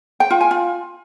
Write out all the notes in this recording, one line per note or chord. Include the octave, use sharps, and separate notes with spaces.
G5
F4
G#5
F4